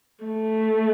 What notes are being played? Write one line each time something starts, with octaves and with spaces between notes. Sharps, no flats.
A3